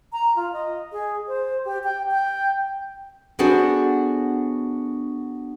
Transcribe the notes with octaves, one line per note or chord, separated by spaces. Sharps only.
A#5
F4
D#5
G#4
C5
G4
G5
G5
B3 D4 F#4 G#4 A4 C5